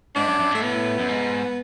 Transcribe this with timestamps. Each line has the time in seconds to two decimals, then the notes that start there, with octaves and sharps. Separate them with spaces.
0.16 G#2 D4
0.28 F#2
0.39 F#2
0.51 G#2 A3
0.62 A2 B3
0.99 F#2
1.09 G#2